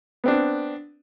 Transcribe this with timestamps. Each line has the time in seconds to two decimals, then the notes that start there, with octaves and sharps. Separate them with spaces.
0.24 B3 C4 D4